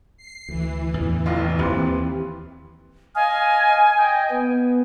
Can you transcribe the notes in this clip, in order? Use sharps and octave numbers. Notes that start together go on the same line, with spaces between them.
C7
D2 E3
E2 A2 D3
F1 A#1 F4
D#2 C4 G4 B4 C6
D#5 F5 G#5
D#5 G5
B3